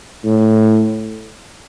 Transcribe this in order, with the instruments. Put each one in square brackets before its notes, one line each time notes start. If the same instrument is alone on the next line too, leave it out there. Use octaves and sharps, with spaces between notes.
[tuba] A2